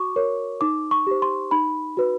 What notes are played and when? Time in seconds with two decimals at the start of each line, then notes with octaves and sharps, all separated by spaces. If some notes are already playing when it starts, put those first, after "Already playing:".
Already playing: F#4 C#6 D6
0.16 A#4 C#5
0.61 D#4 D6
0.91 C#6
1.07 G4 C5
1.22 C6
1.51 D#4 B5
1.97 F#4 B4